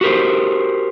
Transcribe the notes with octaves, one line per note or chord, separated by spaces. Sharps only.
F#4 G4 A#4 C5